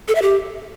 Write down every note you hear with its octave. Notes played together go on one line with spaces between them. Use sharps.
A4
E5
G4